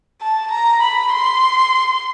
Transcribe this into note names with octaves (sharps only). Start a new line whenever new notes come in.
A5
A#5
B5
C6